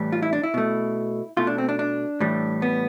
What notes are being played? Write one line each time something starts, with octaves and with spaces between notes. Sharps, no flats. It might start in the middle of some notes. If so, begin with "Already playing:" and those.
Already playing: A2 E3 G3
F4
E4
D4
E4
B2 A3
B2 A3 F4
D4
C4
D4
D4
A2 E3 G3
B3